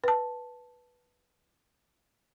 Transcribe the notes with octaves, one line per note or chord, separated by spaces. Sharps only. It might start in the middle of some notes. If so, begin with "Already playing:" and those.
B4 A5